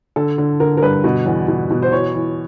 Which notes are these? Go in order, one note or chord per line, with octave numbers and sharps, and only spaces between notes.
D3 A4
D3
D3 A#4
A#4
G2 B4
B2
E2
B2
B2
C5
E3 C#5
E3